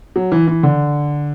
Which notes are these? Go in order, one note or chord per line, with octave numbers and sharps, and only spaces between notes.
F#3
E3
E3
D3